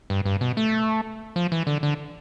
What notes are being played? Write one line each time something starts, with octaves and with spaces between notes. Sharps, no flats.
G2
G2
B2
A3
F3
E3
D3
D3